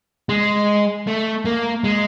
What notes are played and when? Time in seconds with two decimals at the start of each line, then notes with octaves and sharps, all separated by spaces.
0.29 G#3
1.07 A3
1.45 A#3
1.84 G#3